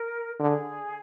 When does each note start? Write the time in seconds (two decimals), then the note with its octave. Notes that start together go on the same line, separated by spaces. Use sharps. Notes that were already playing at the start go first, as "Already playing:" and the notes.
Already playing: A#4
0.39 D3 G#4